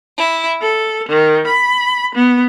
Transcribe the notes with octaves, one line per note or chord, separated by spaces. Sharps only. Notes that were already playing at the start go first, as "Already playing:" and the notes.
E4
A4
D#3
B5
B3